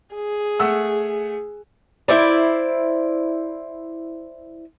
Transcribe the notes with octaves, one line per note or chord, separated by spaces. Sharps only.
G#4
A3 F#5 E6
E4 C5 D5